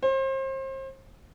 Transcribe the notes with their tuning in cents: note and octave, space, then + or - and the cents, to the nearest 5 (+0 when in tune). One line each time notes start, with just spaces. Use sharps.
C5 +35